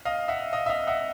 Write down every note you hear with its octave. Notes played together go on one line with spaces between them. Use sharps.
D#5 F5
E5 F#5
D#5 F5
E5
D#5 F5
E5 F#5